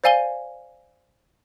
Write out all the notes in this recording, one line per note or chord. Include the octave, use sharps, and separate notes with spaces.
C5 D5 F5 G#5 D#7 G7